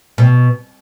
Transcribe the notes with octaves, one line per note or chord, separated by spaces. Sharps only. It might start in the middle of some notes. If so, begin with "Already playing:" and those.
B2